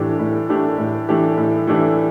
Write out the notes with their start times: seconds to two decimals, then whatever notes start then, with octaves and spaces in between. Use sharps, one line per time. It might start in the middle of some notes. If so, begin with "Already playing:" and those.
Already playing: A2 E3 A3 D4 G4
0.19 A2
0.49 E3 A3 D4 G4
0.78 A2
1.09 E3 A3 D4 G4
1.37 A2
1.67 E3 A3 D4 G4